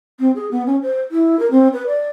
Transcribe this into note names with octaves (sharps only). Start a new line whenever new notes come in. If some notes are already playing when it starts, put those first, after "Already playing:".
C4
G#4
B3
C#4
C5
E4
A#4
C4
B4
D5